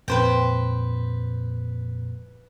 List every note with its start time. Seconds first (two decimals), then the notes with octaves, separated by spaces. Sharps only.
0.08 F2 A#2 B4 C5 G5